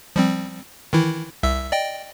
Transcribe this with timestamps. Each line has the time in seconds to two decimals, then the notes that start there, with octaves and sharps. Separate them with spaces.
0.16 F3 G3 C4
0.93 D#3 E3 E4
1.43 C2 E5 E6
1.72 D5 D#5 G5